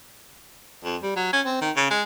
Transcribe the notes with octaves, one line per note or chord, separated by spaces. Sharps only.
F2
G3
F#3
C#4
C4
D#3
C#3
G#3